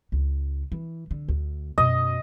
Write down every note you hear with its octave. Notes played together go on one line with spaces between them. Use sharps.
C#2
E3
D3
D2
F#2 B2 D#5